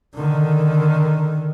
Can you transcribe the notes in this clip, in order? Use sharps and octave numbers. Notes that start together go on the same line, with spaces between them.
D3 D#3